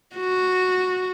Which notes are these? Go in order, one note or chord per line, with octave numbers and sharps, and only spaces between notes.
F#4